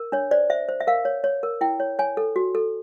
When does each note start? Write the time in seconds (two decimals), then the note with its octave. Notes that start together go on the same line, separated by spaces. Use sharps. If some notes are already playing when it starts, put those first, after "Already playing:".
Already playing: A#4
0.12 D4 C#5
0.31 C5 D5
0.50 C5 E5
0.69 C5
0.80 E5
0.87 A#4 F5
1.05 C#5
1.24 C#5
1.43 A#4
1.61 E4 G5
1.80 C#5
1.99 C#5 G#5
2.17 A4
2.36 F#4
2.55 A4